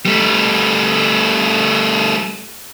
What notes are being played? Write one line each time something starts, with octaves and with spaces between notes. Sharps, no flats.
G3 A3